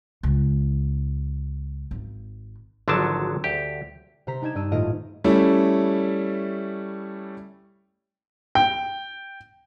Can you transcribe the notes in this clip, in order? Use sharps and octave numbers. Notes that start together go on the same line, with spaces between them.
C#2
G#1
G#1 D3 F3 F#3 D4 A5
D2 G4
C3 C5 A#5 B6
D4 D#4 G5 G#6 E7
G2 D4 E6 D#7
D#1 A2 A3 F4 D#5 D7
G3 A3 C#4 E4
G5